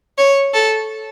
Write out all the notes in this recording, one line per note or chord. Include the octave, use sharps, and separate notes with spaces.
C#5
A4